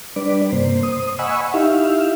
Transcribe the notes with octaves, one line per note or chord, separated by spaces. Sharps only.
G3 D4 B4 D5
G2 C3 A#3 C5
C5 D#6
D#5 F#5 G#5 B5 C#6 E6
D#4 E4 G4 E5 F5